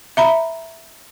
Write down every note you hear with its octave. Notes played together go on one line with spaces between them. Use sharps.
E5 A#5 B5